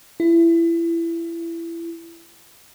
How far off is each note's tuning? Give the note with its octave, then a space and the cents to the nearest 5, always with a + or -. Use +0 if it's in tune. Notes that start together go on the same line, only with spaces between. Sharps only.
E4 +25